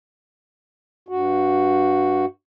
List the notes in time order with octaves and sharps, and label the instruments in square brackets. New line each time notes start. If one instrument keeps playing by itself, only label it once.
[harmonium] G2 F#4